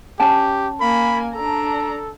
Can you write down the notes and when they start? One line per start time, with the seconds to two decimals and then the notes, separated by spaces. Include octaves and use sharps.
0.20 C#4 G4 G5 A5
0.81 A#3 G#5 B5
1.35 D4 A4 A#5